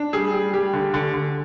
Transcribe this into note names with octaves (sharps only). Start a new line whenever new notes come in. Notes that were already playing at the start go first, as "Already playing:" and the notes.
Already playing: D4
G3 G#4
G3
G3 G4
D3
D3
D3